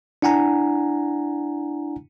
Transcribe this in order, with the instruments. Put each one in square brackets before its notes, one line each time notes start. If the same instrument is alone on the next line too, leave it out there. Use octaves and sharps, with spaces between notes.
[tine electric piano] D4 E4 F#5 G#5 A#5